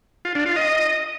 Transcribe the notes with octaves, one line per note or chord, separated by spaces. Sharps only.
F4
D4
F4
D#5